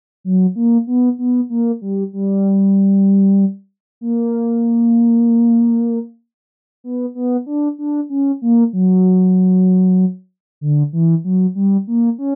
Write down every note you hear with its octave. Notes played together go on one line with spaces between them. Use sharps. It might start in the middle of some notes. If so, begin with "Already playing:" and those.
F#3
A#3
B3
B3
A#3
G3
G3
A#3
B3
B3
D4
D4
C#4
A#3
F#3
D3
E3
F#3
G3
A#3
C#4